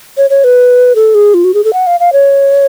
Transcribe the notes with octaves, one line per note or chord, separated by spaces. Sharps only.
C#5
C#5
B4
A4
G#4
F4
F#4
G#4
A4
F#5
F5
F5
C#5